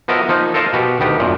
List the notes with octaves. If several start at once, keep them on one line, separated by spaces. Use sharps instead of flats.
F3 B3 F#4 A#4 D#5 E5
F3 A#3 D#4
A4 A#4 C5 D#5 F5 A5
B2 F#4 G4
D2 D#3 B3 G4
F#2 A#2